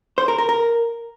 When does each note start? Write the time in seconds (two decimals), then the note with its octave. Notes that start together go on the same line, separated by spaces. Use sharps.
0.18 C5
0.28 A#4
0.38 A#4
0.49 A#4